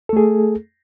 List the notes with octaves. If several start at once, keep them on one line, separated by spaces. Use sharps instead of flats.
A3 G#4 A4